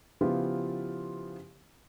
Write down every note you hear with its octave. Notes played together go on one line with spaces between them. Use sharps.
C#3 F3 B3 E4 F4 G4